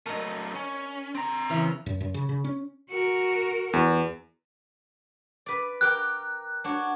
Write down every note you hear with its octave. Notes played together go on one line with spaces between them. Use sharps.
F#3 A3 A#4 D#5
C#4
C4 A#5
C#3 E3 C#5
F#2
F#2
C#3
C#3
C#4
F#4 A#4
E2
B4 D5
G4 A#4 G5 F#6
D4 F#4 C#5